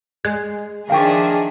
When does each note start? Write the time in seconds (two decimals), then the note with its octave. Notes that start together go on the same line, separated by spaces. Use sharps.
0.25 G#3 F#6 G#6
0.90 D#3 F3 D4 G#4 E5 F5 G5 C#6